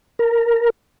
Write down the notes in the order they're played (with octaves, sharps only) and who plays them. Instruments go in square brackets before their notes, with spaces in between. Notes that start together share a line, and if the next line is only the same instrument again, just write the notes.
[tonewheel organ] A#4